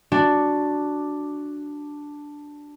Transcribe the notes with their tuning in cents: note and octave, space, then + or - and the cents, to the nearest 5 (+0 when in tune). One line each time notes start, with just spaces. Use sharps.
D4 +0 F#4 +0 D5 +0